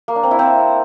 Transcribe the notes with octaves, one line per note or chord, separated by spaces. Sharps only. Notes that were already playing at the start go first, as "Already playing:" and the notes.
A#3
D4
C4
E4
C4